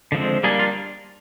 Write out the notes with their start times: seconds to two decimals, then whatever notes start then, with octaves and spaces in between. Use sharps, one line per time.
0.12 D3 F3 G#3 C4
0.43 G3 A#3 D4 G#4
0.59 F4